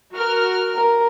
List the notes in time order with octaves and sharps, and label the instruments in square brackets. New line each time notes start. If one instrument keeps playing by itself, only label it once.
[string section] F#4 A#4 F6
[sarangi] A#4